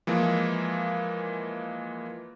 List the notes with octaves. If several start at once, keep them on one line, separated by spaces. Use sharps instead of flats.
E3 F3 G#3 A#3